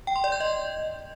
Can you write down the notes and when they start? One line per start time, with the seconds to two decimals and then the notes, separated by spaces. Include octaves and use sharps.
0.07 G5
0.16 C6
0.24 D5
0.32 G6
0.40 D#5